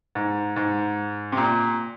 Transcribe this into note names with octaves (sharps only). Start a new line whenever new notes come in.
G#2
G#2
C3
A#2